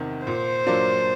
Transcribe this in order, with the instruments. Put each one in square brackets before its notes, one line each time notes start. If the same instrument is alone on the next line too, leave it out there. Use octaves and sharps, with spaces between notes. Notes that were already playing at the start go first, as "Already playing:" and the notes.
Already playing: [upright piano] E2 C3 D#3
[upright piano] A#2 [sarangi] C5
[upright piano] F#3 A#3 D4 F4